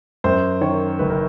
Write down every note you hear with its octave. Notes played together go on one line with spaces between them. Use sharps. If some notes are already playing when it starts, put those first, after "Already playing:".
F#2 C5
D#3 C#5
F#1 B4
A#4